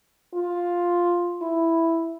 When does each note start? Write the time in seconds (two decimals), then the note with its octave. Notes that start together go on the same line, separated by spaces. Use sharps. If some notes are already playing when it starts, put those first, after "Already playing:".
0.34 F4
1.42 E4